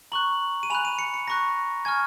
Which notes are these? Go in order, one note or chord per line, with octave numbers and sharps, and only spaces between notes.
A#5 C#6 F#6 F#7
D#7
G#5 B5 F#6 F7
D#7
C#7
C#7
A#5 C#6 F#6 A#6
G#5 C#6 F6 G#6